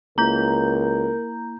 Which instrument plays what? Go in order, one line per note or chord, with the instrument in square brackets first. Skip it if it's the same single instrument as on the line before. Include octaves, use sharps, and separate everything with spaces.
[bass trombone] C#2 [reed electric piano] A#3 E4 [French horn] A#4 [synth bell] A#5 G6